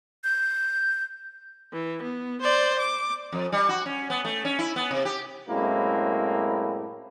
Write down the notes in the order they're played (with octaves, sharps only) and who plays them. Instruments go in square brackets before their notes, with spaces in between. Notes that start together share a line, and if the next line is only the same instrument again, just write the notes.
[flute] G6
[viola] E3
B3
C5 D5
D6
[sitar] F2
G3
F#4
C#4
B3
A3
C#4
E4
B3
C3
G4
[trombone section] F#2 A2 G#3 A#3 C4 E4